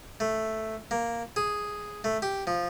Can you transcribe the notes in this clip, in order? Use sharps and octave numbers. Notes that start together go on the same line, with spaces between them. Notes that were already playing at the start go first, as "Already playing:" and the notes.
A3
A#3
G#4
A3
G4
F3